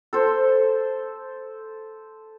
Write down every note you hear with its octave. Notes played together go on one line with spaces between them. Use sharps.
A4 C5